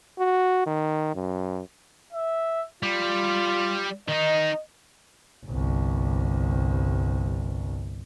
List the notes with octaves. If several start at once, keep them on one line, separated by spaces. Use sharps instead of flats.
F#4
D#3
F#2
E5
G3 F4
D#3 D#4 D#5
G1 C2